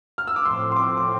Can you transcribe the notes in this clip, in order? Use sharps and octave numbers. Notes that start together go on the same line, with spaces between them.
F6
E6
D6
A2 F3 C4 C6
C6
D6
D6